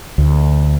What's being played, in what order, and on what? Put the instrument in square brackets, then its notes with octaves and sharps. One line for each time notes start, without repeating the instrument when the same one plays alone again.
[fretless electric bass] D2